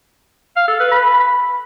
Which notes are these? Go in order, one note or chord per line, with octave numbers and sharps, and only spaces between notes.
F5
A4
B4
B5